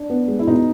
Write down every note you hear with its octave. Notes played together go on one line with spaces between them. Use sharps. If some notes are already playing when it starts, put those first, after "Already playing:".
Already playing: D4
B3
G#3
E4
B2 D#4